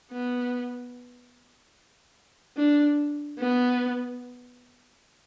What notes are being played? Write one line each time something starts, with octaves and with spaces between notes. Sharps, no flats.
B3
D4
B3